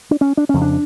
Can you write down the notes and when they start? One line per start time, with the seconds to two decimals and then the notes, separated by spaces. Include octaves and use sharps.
0.11 D4
0.21 C#4
0.37 D4
0.49 F2 C#3 C#4
0.62 D4